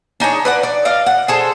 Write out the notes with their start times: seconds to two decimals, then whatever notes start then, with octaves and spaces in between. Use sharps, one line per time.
0.20 D4 D#4 G#4 C#5
0.45 B4 D5 F#5
0.63 D5
0.85 D5 D#5 F5
1.06 F#5
1.28 G#4 A4 C5